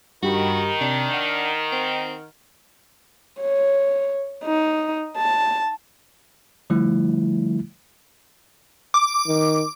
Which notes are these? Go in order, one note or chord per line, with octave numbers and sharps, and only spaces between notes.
G2 D#3 F#4 G4 B5
C3 D4
F#5 F6
C4
C#5
D#4
A5
D3 F3 G3 A3 E4
D6
D#3